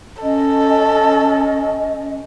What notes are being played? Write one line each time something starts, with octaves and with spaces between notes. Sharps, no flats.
C#4 A4 D#5